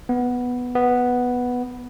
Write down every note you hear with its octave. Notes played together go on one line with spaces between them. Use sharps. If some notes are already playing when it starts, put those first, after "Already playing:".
B3
B3